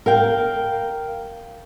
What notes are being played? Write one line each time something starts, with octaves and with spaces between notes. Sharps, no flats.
A#4 F5 G5